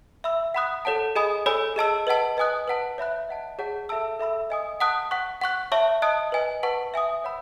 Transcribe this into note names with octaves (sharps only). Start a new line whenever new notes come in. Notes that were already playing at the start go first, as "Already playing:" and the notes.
E5 B5 E6
F#5 B5 D#6 F#6
A4 C#5 F#5 A5
G#4 D#5 G#5 B5 D#6
A4 C#5 G#5 B5 E6
G#4 D#5 A5 E6
B4 D#5 F#5 A5
B4 D#5 G#5 D#6 F#6
B4 F#5 A5
C#5 E5 B5 F#6
D#5 F#5 A5
G#4 C#5 F#5 A5
A4 E5 A5 E6
A4 E5 B5 E6
D#5 G#5 D#6
F#5 A5 D#6 F#6
F#5 C#6 F#6
F#5 C#6 F#6
C#5 E5 A5 C#6
D#5 A5 D#6 F#6
B4 D#5 G#5
B4 F#5 A5 C#6
E5 G#5 D#6
C#5 F#5 B5 E6